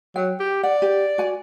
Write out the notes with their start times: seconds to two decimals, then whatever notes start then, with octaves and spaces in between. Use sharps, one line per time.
0.16 F#3 G5
0.39 G4
0.63 D5 F#5
0.82 G4
1.18 F#4 G#5